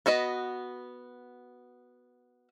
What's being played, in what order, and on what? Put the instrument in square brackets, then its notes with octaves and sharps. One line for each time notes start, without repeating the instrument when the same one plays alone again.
[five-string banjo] B3 F#4 B4 D#5